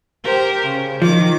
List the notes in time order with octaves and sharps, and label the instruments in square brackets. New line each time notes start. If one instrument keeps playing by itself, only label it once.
[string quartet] G4 A#4 C5
C#3
[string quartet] D#3 D6 [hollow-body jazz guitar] F3